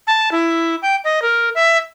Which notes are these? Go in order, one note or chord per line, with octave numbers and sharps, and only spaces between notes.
A5
E4
G5
D#5
A#4
E5